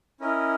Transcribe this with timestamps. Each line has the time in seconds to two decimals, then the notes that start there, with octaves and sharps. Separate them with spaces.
0.20 C#4 E4 A#4 D#5